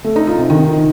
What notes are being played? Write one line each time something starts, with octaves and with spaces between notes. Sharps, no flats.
A3
D#4
F4
C3
D#3